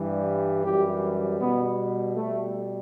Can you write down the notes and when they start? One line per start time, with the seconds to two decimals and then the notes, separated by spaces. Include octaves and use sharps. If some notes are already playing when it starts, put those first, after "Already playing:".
Already playing: G2 E3 G3
0.63 F#2 E3 G3 G4
1.40 B2 G3 B3
2.16 B2 G3 A3